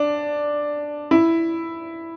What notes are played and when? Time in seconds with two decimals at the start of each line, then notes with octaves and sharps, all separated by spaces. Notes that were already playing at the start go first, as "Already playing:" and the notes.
Already playing: D4
1.11 E4